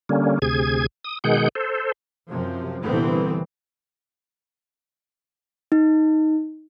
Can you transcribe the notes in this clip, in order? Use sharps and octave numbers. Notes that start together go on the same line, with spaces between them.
D3 G3 A#3 C#4
D2 C3 G#4 G#6
D#6
B2 D#3 G#3 G#4 F#5 G6
A4 C5
F#2 C3 F3
C2 A#2 D3 E3 B3 C4
D#4